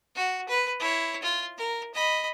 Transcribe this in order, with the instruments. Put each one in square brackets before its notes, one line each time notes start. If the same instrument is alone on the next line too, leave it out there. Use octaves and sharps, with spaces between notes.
[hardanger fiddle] F#4
B4
E4 C#5
F4
A#4
D#5 B5